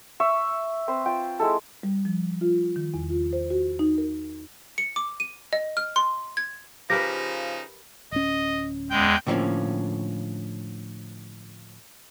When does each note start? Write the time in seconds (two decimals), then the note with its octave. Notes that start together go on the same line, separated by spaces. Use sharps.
0.20 E5 C#6
0.88 C4 B4 C5
1.06 F4 G5
1.39 G#3 E4 A4
1.83 G3
2.05 F3
2.41 F4
2.76 D#3
2.94 E2
3.10 F4
3.33 C5
3.50 F#4
3.79 D#4
3.98 A#4
4.78 C#7
4.96 D6
5.20 D#7
5.53 D#5
5.77 F6
5.96 C6
6.37 G#6
6.90 C#3 F3 D#4 G4 A#4 B4 A#6
8.12 D1 C#4 D#5
8.90 E2 G#3 G5
9.27 A2 D3 F3 G3 A#3 C#4